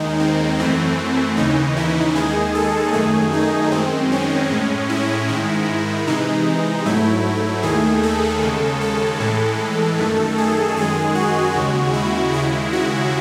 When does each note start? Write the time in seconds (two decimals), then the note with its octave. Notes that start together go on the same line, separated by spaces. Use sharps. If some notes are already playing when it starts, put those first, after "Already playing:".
Already playing: D#2 D#3 G#3 D#4
0.20 C4
0.59 F#2 E3 A3 C4
1.37 D#2 C#3 E3 D#4
1.77 E4
2.15 D#2 D#3 G#3 G#4
2.55 A4
2.93 F#2 D#3 A3 G#4
3.33 D#4
3.72 F#2 D#3 G#3 C4
4.12 C#4
4.51 A2 G#3
4.89 E4
5.28 G#2 D#3 G#3
6.07 C3 E3 G#3 D#4
6.85 G#2 F#3 A3 E4
7.63 D#2 D#3 A3 G#4
8.03 A4
8.42 D#2 C#3 G#3
8.81 A4
9.20 A2 E3 G#3
9.98 F#2 D#3 A3
10.38 G#4
10.76 F#2 D#3 G#3 G#4
11.15 F#4
11.55 D#2 C#3 G#3
11.93 E4
12.33 D#2 C#3 G#3 E4
12.73 F#4